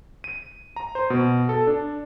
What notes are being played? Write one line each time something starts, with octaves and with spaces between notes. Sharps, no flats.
D#7
A#5
C5
B2
A4
D4